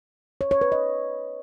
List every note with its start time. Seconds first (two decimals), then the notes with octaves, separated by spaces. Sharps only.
0.41 C#5
0.51 C#5
0.61 B4
0.72 D#5